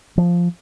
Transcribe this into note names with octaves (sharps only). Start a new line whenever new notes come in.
F3